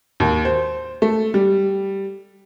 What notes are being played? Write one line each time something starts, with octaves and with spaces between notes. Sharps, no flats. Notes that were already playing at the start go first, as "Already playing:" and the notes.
D#2
C5
A3
G3